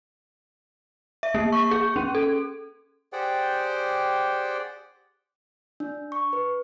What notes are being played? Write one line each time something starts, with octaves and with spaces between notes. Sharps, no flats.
E5
A#3
C#6
G#4
C#4
A4
G4 G#4 C5 D5 F#5 G5
D4
C#6
B4